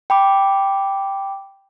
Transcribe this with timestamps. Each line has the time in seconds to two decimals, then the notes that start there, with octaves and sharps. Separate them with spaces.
0.10 G5 B5 D6